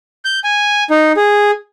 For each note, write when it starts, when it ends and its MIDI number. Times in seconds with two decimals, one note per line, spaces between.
0.25 0.39 91
0.44 0.84 80
0.90 1.12 63
1.17 1.51 68